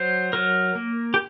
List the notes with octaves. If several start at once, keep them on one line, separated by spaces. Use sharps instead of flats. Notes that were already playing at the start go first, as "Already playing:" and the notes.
Already playing: F#3 C5
F#3 A#4
A#3
G4